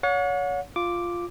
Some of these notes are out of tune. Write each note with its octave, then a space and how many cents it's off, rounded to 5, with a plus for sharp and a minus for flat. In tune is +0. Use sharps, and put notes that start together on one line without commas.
C#5 +30 F#5 -40
F4 +0 D6 +0